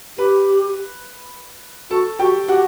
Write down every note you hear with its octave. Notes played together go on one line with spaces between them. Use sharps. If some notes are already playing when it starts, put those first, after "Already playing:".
G4 B4 B5
F#4 A4 A5
F#4 G4 G5
F#4 G4 F#5